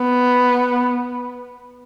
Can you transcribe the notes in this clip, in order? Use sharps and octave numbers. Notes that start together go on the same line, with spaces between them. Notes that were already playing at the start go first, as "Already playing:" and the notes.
Already playing: B3